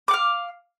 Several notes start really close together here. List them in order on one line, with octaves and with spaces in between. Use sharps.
D6 F#5 F5